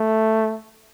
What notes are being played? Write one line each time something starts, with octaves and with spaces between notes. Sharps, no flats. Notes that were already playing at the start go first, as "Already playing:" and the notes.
Already playing: A3